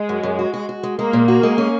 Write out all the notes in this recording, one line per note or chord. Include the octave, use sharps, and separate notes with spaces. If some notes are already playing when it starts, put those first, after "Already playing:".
Already playing: G#3
F#2
F#2
F#4
F#4
F#4
G#3
G#3 A#3
A#2
F#4
G#3
C#4